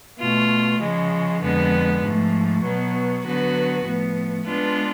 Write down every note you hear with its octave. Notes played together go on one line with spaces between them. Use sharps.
B2 A3 F4
C#3 F3 G#3
F2 D3 G#3 B3
G#2 F3 A3
B2 F#3 B3
D3 F#3 B3 F#4 B4
A2 F3 B3
G#3 B3 D4 F4 B4